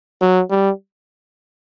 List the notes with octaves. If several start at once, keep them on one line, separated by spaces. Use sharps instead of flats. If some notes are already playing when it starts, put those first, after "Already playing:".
F#3
G3